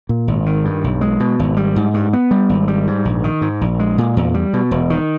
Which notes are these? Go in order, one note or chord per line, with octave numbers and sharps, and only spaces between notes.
A#2
G#1
D#3
G2
B1
G#3
B2
G#1
G3
G#2
G2
B3
G3
G#1
G3
G#2
A#1
D#3
G#2
A#1
G#3
A#2
E2
G3
B2
E1
D#3